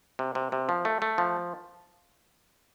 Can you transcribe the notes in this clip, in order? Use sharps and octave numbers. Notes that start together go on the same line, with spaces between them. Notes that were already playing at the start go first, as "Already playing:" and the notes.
C3
C3
C3
F3
A3
A3
F3